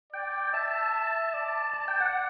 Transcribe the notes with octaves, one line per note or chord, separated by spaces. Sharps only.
D5 G5
E5 A5
D5 A5
A5
G5
F#5